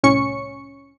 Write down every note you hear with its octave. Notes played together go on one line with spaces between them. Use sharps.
C2 A2 C#4 C#6 C#7